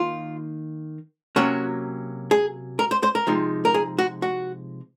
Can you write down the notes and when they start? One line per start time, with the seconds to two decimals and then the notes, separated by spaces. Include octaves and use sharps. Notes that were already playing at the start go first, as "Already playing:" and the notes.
Already playing: D#3 A#3 D#4 F4
1.36 C3 F#3 A#3 C#4 F#4
2.31 G#4
2.79 A#4
2.91 C5
3.03 C5
3.15 A#4
3.27 C3 F3 G#3 D#4
3.65 A#4
3.74 G#4
3.98 F#4
4.22 F#4